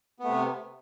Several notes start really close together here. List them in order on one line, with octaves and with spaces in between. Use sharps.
B3 A3 C3